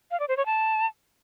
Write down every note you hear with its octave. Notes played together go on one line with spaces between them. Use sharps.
F5
D5
C5
C#5
A5